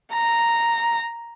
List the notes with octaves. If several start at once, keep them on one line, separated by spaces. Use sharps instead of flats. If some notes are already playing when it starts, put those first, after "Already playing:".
A#5